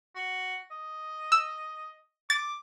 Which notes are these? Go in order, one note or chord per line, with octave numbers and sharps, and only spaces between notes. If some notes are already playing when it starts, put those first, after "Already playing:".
F#4
D#5
E6
D6 A6